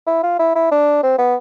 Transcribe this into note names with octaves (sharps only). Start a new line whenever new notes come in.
E4
F4
E4
E4
D4
C4
B3